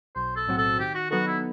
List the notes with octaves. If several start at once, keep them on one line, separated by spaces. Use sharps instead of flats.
B1 C5
A4
A2 F#3 C4 F#4
A4
D#3 G4
F#4
F#3 B3 D#4 F#4 A4
E4